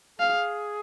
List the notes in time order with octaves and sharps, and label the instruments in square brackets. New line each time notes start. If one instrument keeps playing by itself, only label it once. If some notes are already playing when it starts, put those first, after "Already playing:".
[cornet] G#4 [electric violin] F5